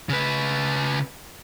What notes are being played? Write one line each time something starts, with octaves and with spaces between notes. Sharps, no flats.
C#3 B4